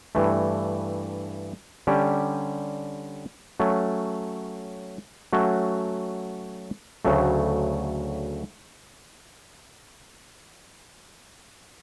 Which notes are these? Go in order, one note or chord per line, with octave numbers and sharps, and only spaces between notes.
G2 E3 A3
D3 G3 C#4 G4
F#3 A3 C#4
F#3 A3 C#4 F#4
D2 C#3 F#3 A3